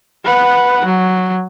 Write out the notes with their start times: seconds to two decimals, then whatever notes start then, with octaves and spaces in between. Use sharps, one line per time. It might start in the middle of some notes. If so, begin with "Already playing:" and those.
0.25 B4 F#5
0.85 F#3